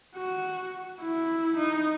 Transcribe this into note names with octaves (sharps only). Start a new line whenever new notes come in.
F#4
E4
D#4